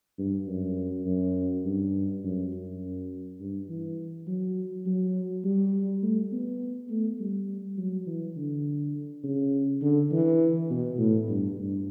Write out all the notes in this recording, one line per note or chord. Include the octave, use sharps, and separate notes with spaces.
G2
F#2
F#2
G2
F#2
F#2
G2
E3
F#3
F#3
G3
A3
B3
A3
G3
F#3
E3
D3
C#3
D3
E3
B2
A2
G2
G2